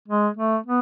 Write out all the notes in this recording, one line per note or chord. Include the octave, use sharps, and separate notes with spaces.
G#3
A3
B3